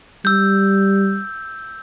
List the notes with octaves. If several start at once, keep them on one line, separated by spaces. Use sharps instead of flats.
G3 E6 G6